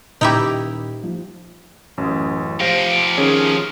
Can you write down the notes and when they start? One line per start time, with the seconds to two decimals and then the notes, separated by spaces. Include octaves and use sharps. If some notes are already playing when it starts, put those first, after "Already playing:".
0.21 D#1 D#4 E4 G4 G5
1.03 F3
1.98 A1 F#2
2.60 F3 G4 C5 F5 A#6
3.18 D#3 C#4 G#4